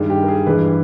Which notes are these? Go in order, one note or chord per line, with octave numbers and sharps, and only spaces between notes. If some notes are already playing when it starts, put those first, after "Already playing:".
Already playing: G2 D#3 G#3
G4
A#4
G#4
G2 E3 G#3 B4